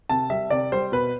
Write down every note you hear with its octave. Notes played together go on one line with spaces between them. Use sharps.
C3 A5
G3 E5
C3 D5
G3 C5
B2 B4